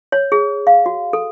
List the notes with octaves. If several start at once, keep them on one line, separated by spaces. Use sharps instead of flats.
C#5
G#4
F5
F#4
A4